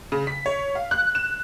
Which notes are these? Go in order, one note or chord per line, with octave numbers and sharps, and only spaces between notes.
C#3
B6
C#5
F5
F#6
E7